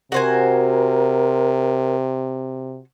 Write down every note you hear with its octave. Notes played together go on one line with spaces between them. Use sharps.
C3 F#4 A#4 C5 G#5